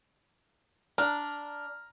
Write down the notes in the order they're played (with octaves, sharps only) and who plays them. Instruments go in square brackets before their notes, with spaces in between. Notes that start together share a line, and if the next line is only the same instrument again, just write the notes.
[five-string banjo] D4 [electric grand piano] A#5 F6